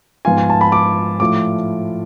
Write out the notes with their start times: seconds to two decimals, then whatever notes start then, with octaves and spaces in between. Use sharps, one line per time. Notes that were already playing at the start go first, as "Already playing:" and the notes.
0.25 G#2 F3 B3 F4 G#5
0.38 G#5
0.50 A5
0.61 B5
0.72 D6
1.20 A2 F3 A3 F4 D6